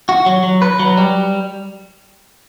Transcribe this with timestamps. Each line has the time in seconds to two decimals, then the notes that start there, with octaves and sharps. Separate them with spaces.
0.09 F#4
0.26 F#3
0.43 F#3
0.62 B4
0.79 F#3
0.98 G3